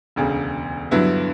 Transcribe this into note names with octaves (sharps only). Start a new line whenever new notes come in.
E1 D2 C#3
G2 D3 F#3 B3 E4